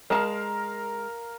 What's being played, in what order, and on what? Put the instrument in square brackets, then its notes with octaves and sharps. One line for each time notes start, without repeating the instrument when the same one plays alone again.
[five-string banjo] G#3 A5 [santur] A#4 F5